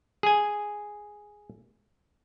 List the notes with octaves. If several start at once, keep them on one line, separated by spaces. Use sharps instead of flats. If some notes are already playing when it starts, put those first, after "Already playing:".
G#4 G#5